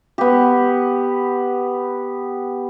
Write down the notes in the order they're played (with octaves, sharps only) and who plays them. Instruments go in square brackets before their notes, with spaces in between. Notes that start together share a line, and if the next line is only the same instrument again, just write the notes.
[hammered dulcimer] B3 G4